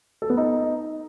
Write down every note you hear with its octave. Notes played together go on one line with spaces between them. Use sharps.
A4
B3
D#4